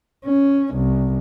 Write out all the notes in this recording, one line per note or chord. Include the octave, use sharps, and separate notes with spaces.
C#4
C2